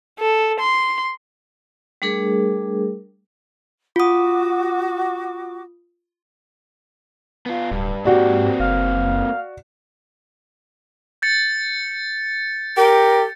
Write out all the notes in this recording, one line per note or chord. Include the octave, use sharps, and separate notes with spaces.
A4
C6
G3 A3 D4 G#4 A#4
F4 F#4 D6 D#6
B3 F4
D1 G2
G#2 A#3 C4 F#4 G4 D5
F#1 F5
G6 A6 C#7
G4 A#4